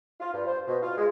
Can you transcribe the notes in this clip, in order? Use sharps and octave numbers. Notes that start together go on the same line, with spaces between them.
F4
G2
C5
B2
F4
G#3